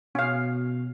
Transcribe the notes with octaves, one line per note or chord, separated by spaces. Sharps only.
B2 C#4 F5